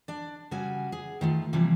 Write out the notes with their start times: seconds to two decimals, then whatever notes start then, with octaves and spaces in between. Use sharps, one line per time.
0.08 D4 D5
0.51 C#3 G3 F#4 G#5
0.92 G#4
1.21 D#3 A3 F4
1.53 C3 E3 F3 G3 A#3